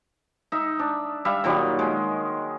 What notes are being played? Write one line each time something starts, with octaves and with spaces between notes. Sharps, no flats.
D#4 E5
D4
G3 E5 F5
A#2 D#3 F#3 G3
G#3